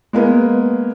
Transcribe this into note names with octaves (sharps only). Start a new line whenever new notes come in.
G#3 A#3 B3